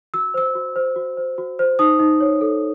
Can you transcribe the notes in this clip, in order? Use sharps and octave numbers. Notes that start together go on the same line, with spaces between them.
F#4 E6
C5 E6
F#4
C5
F#4
C5
F#4
C5
D#4 D#6
D#4
C#5
A4